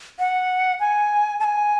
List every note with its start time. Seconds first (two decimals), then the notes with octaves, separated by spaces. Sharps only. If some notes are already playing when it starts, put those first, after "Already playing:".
0.19 F#5
0.80 G#5
1.40 A5
1.44 G#5